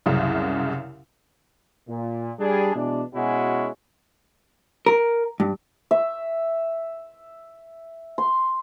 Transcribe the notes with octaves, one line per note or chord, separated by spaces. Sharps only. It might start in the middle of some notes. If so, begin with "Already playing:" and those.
C2 F#2 C#3
A#2
G3 D4 G#4
B2 E3 G#3 D4
B2 G#3 C#4 E4 F#4
A#4
G2
E5
C6